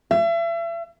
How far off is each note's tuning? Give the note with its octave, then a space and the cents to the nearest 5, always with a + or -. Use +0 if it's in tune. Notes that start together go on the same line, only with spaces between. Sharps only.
E5 +35